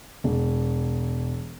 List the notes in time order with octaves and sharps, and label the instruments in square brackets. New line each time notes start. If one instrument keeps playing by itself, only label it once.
[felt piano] E1